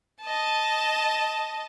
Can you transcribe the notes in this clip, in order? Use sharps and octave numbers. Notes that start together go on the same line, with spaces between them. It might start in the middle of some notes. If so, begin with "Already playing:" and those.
D#5 A5